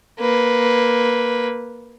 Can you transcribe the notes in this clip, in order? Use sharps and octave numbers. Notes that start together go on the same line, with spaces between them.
A#3 B4